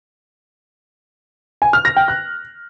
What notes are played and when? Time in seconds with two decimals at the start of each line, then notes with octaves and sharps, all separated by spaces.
1.62 G#5
1.73 F6
1.85 A#6
1.96 G5
2.08 F#6